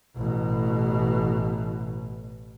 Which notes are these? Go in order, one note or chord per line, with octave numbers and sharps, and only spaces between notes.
A1 B2